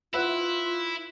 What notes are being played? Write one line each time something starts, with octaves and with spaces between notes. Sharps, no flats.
E4 F4 B4 E5 F#5